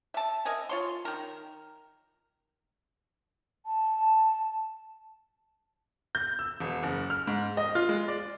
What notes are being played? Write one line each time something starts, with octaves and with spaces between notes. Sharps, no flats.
E5 A5
A#4 D#5 E5 G#5
F4 C#5 C6
D#3 A#4
A5
G6
E6
E1
F#1
F6
G#2
D#5
F4
G#3
D5